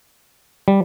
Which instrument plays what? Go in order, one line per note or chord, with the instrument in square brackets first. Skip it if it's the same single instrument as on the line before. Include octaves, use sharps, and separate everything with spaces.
[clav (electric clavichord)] G3